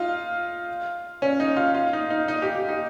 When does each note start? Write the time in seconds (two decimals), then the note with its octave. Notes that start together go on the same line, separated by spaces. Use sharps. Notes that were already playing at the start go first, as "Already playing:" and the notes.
Already playing: D#4 F4
1.22 C#4
1.40 D#4
1.57 F4
1.75 F4
1.93 D#4
2.10 D#4
2.28 D#4
2.42 G4
2.55 G4
2.69 D#4